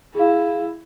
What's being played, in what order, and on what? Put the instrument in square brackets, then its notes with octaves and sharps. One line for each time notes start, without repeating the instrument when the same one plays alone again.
[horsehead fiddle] E4 [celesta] G#4 F5